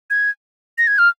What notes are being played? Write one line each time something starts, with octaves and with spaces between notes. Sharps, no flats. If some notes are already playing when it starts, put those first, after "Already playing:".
G#6
A#6
G#6
F6